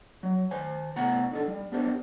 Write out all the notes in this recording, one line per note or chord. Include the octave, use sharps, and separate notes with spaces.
F#3
D#3 C5 G#5
A2 C3 B3 F#5 A#5
D3 D#4 A4
G3
B3 D4 G4 A#4 C5